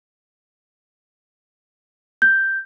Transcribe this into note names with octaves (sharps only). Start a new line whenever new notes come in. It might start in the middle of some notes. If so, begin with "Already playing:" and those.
G6